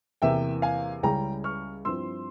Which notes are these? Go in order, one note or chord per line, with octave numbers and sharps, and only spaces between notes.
E2 C3 E3 A#3 E5 G5
F5 G#5
C#2 C#3 G3 C#4 E4 G5 A#5
C#6 F6
G2 F3 C4 E4 C6 E6